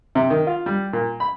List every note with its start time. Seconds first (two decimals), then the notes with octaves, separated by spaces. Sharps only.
0.15 C3
0.30 D#3
0.47 F4
0.66 G3
0.93 A#2
1.20 B5